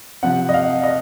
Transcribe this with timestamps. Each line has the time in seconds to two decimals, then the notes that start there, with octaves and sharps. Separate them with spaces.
0.23 C3 F3 C4 F#5
0.49 D#5
0.54 F5
0.83 D#5